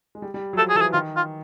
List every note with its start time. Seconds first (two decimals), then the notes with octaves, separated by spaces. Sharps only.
0.15 G#3
0.22 G3
0.34 G3
0.53 F#3
0.57 F3 A4
0.70 G#4
0.75 E3 A4
0.81 G#4
0.93 D#3 F4
1.17 F4